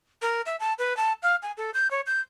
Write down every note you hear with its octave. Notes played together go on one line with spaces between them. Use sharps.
A#4
E5
A5
B4
A5
F5
G#5
A4
G6
C#5
G6